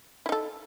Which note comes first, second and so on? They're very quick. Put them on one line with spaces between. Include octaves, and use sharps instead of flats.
E4 D#4 A4